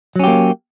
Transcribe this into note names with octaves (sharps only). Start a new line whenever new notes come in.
F#3 A#3 C#4 G4